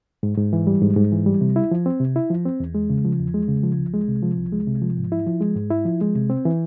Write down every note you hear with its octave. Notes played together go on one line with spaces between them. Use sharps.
G#2
G#2
E3
G3
G#2
G#2
E3
G3
C3
E4
F3
C4
C3
E4
F3
C4
E2
G#3
C#3
F3
E2
G#3
C#3
F3
C2
G#3
C3
F3
C2
G#3
C3
F3
G#2
E4
F3
G#3
G#2
E4
F3
G#3
C3
C4
E3